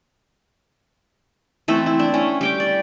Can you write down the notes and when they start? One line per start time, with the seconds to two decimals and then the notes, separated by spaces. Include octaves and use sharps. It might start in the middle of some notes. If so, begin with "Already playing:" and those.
1.68 E3 A3 C4 E4
1.86 E4
1.99 D4
2.14 A3 C#4
2.41 G3 G5 D6
2.60 D5